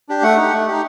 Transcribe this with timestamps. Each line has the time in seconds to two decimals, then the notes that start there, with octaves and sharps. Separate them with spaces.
0.09 D4 G4
0.22 A3 F#5
0.37 D#4
0.42 G4
0.52 A3
0.67 D#4 G4